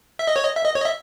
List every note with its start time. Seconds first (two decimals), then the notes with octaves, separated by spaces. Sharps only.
0.19 E5
0.27 D#5
0.36 C#5
0.44 D#5
0.56 E5
0.66 D#5
0.75 C#5
0.81 D#5
0.85 E5